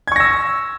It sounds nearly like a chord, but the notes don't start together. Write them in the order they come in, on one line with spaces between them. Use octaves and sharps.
G#6 C#6 A#6 E6